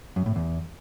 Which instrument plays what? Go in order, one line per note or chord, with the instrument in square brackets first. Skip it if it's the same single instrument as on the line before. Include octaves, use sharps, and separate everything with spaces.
[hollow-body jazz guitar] F#2
A2
E2